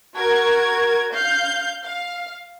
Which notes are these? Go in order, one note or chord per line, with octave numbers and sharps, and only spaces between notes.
F#4 A#4 G#6
F5 G6
F5